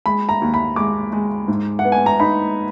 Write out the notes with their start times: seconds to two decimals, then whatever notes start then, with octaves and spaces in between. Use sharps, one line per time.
0.06 G#3 B5
0.29 A#5
0.42 D#2
0.54 B5
0.76 G#3 D6
1.13 G#3
1.48 G#2
1.79 F#5
1.85 B3
1.92 G#5
2.06 A#5
2.20 D#4 B5